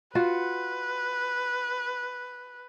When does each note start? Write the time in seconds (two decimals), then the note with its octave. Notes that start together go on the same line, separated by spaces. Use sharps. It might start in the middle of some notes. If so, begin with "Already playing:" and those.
0.15 F4 F#4 B4